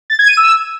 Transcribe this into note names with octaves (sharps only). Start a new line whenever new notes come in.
A6
G#6
D#7
E6